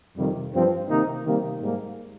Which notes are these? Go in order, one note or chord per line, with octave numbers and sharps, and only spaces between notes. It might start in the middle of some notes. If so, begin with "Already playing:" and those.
F2 C3 D#3 G3
G2 F3 C4
C3 D#3 A#3 D#4
C3 D#3 G3 A#3
G#2 G3 A#3